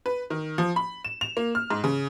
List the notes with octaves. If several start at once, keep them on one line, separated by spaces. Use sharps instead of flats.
B4
D#3
F3
B5
E7
F7
A#3
F6
G#2
C#3